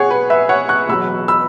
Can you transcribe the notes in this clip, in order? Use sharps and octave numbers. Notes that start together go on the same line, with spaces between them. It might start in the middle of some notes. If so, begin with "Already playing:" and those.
Already playing: B2 G#4 C#5 F#5
B4
B4 E5
C#5 F#5
C#6 F#6
E1 E2 B2 F#3 B5 E6
B5 E6